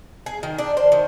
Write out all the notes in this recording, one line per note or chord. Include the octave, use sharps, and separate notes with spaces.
G#4
D#3
D4
C5
D#3